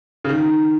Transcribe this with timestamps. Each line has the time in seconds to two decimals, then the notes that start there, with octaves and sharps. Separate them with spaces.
0.24 C#3
0.29 D#3